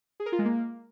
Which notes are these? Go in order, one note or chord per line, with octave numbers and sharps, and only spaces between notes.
G#4
A#4
F4
G#3
A#3